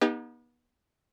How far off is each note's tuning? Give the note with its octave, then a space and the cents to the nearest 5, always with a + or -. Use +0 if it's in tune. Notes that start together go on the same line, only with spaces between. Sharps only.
B3 -35 D#4 +0 G4 +25